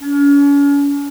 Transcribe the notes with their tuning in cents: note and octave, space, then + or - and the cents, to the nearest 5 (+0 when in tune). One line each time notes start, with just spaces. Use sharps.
C#4 +40